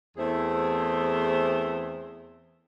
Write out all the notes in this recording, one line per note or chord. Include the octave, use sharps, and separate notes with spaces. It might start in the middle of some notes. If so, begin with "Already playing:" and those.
E2 A3 C4 E4 G#4 C5